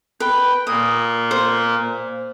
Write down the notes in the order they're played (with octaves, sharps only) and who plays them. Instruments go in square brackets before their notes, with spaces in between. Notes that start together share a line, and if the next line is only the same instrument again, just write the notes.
[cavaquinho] B4 [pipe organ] G5
[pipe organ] A#2 A#3 [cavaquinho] D#6
[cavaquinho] C5